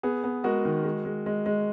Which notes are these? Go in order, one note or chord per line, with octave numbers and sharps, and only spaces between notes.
B3 G#4
B3
G#3 F#4 A#4
D#3
G#3
G#3
G#3
G#3